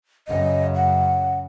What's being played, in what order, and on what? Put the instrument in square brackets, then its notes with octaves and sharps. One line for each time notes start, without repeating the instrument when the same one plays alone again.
[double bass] F#2 C#3 [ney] D#5
[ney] F#5